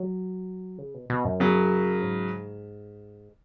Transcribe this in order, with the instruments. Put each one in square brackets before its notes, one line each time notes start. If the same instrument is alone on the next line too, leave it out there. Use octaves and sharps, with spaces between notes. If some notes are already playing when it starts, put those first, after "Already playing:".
Already playing: [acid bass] F#3
C#3
B2
B2
F#2
[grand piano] C#3 F#3
[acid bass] G#2